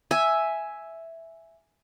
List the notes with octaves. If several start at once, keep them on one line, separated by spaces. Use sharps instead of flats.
E5 G#5